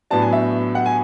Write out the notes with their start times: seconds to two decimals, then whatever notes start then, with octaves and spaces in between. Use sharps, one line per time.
0.10 A2 F#3 B3 D4 A5
0.22 G#5
0.33 E5
0.75 F#5
0.86 G#5